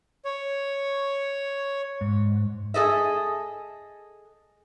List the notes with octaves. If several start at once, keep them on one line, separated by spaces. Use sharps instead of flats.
C#5
G#2
G#4 A4 D#5 E5